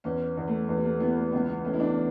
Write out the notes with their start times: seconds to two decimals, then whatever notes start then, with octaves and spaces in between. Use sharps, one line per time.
0.04 E2 C#4
0.37 E2
0.48 A3
0.69 E2
0.77 G3
0.85 A3
1.00 E3 B3
1.16 A3
1.32 C#2 B3
1.49 B3
1.64 A3 C#4
1.74 E4
1.80 D4